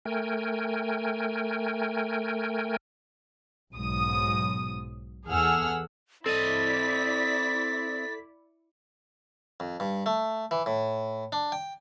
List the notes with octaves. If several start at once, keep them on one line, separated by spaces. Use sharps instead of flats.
A3 A#4 G5 G#5
B1 G#2 D#6
E2 G#4 A4 F#5 E6 F6
C4 E4 A4 D5 D#5 A6 B6
F2
G2
A3
E3
A2
D4
G5